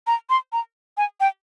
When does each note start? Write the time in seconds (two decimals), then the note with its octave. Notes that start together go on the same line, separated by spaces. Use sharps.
0.07 A#5
0.30 C6
0.52 A#5
0.97 G#5
1.20 G5